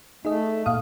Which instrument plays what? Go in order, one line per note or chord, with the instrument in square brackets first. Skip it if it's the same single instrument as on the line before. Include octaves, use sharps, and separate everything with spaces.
[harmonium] A3 [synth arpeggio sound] D#4 G#4 D#5
[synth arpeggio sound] A#2 F5 D#6